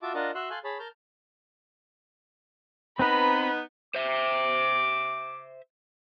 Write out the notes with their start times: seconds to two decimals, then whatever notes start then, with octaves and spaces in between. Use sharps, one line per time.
0.02 F4 F#4 E5 A5 D6
0.14 D4 F4 A#4 D#5 F#5 A5
0.35 F#4 E5 C6 E6 F#6
0.50 A4 F5 G#5 C6 F#6
0.64 G#4 C#5 A5 B5
0.79 A#4 A5 F6 G6
2.99 B3 C4 D#4 B4 A#5 B5
3.95 C5 E5 D6